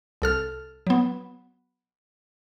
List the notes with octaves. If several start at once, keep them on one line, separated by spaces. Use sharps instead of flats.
C2 A4 F6
F#3 B3